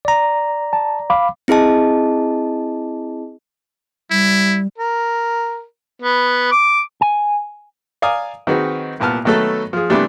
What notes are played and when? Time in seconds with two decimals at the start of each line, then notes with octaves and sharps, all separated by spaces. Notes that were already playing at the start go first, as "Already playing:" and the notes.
0.05 D5 A#5
0.73 A5
1.10 F5 B5 D6
1.48 C4 E4 G#4 D#5 A5
4.11 G3 E4
4.78 A#4
6.02 B3
6.51 D6
7.01 G#5
8.02 D5 F5 G#5 A#5 D#6
8.47 D#3 C4 D#4 F#4 G#4 B4
9.00 C2 A#2 B3 A5 F6
9.25 D#3 F#3 A3 B3 A4
9.73 F3 G#4
9.90 C3 E3 G3 A3 B3 D4